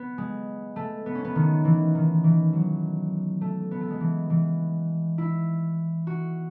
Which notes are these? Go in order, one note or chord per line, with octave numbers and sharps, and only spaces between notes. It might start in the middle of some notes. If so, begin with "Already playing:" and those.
Already playing: B3
G#3
A3
B3
C#4
B3
D#3
E3
D#3
E3
F#3
A3
B3
A3
G#3
E3
E3
E4
F#4